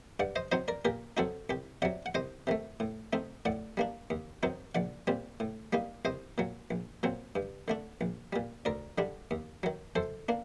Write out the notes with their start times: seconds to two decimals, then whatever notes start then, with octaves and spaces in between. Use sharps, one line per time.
0.20 G2 D5 F#5
0.36 C5 D#5
0.52 F#3 C4 D#4 C5 D#5
0.68 A#4 D5
0.85 A#2 G4 A#4
1.17 F#3 C4 D#4 F#4 A4
1.50 C2 G4
1.82 C3 F#3 D5 F#5
2.06 F#5
2.15 C2 C5 D#5
2.47 C3 D#3 A3
2.80 A2
3.13 A3 C4 D#4
3.45 A2 D5 F#5
3.77 G3 A#3 D4
4.10 D#2
4.43 D#3 F#3 C4 D#4
4.75 A#1 D5 F#5
5.07 A#2 G3 C4
5.40 A2
5.73 G3 A#3 D#4
6.05 C2 C5 D#5
6.38 A#2 F#3
6.71 A#1
7.03 A#2 F#3 C4
7.35 G2
7.68 D3 A3 D4
8.01 A#1
8.33 A#2 G3
8.65 D2 A#4 D5
8.98 D3 G3 D4
9.31 D#2
9.63 D#3 F#3
9.96 F#2 A4 C5
10.29 A#3 D4